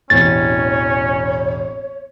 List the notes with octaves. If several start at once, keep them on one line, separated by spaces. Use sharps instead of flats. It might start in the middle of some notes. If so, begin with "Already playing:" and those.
E1 A1 C4 C#4 C#5 A6